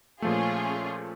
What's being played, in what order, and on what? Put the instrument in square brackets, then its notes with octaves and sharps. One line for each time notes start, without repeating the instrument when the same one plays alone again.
[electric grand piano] A#2 F3 A3 [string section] C#4 F4 G#4